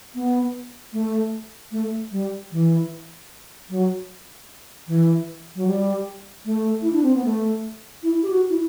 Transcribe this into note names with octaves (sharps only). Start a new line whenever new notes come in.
B3
A3
A3
G3
E3
F#3
E3
F#3
G3
A3
E4
D4
C4
B3
A3
E4
G4
F#4
E4